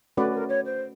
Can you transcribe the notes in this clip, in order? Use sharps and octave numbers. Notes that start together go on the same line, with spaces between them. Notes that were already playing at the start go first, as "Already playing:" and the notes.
A3 C#4 F#4 B4 D5
A#4
C#5
C5